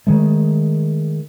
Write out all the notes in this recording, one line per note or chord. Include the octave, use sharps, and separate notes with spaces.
D#3 G#3 A3